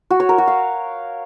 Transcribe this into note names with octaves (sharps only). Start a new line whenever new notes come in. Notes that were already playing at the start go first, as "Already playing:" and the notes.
F#4
C#5
A#4
F#4
F5